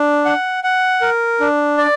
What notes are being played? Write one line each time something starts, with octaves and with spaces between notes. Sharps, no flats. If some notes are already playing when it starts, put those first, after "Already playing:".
Already playing: D4
F#5
F#5
A#4
D4
D5